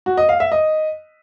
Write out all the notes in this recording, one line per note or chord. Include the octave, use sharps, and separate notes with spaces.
F#4
D#5
F5
E5
D#5